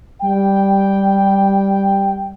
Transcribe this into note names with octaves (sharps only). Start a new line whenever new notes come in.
G3 G5